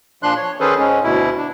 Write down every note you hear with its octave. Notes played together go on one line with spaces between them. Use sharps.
A#2 F3 D4 C6 F#6
C#5
D#3 C#4 G#4 A4 B4 C5
G#2 G#3 C#4
D2 B2 E4
D4